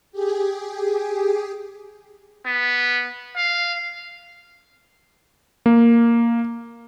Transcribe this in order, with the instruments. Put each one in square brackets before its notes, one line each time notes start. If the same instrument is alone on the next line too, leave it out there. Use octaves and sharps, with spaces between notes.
[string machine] G4 G#4
[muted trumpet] B3
F5
[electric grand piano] A#3